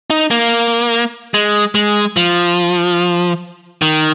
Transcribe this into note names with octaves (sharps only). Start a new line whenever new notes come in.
D#4
A#3
G#3
G#3
F3
D#3